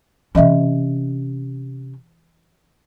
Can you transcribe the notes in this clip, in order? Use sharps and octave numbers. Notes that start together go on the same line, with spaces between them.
C3 E3 C#4 D#5 E5